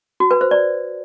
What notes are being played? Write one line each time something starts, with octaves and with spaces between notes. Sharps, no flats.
F#4
B4
C5
D5